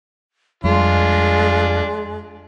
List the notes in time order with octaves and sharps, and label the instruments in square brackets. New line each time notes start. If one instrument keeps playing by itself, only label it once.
[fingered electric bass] F2 G3 [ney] G#3 [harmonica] D4 F4